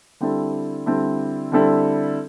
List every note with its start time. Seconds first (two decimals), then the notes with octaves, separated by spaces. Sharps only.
0.20 D3 G3 C4 E4 A4
0.86 D3 G3 C4 E4 A4
1.52 D3 G3 C4 E4 A4